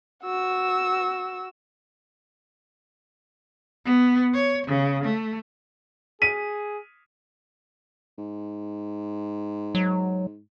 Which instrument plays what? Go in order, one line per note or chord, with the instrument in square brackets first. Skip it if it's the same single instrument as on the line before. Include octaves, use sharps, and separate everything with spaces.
[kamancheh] F#4 E6
[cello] B3
C#5
C#3
A3
[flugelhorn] G#4 [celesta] B6 [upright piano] D#7
[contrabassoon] G#2
[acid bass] F#3